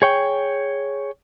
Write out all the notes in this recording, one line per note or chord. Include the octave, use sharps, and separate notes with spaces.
G#4 C#5 G5